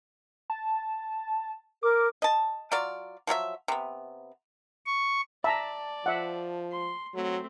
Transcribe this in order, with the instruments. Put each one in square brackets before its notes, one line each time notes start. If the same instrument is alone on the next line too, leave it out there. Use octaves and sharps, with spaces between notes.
[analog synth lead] A5
[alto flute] A#4 [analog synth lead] D6
[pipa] D#5 A5
F#3 F4 D5
F3 F#3 A4 E5
C3 B3
[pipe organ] C#6
[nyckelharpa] D5 [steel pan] E5 A#5 [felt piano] A5
[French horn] F3 [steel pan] E5 F#5
[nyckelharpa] C6
[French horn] F#3 [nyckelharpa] A3 C4